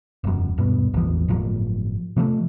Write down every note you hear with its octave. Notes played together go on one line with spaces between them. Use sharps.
E1 F#2
D#1 G2 B2
A1 E2 F3
G1 A2 F3 F#3
C3 F3 G3 A3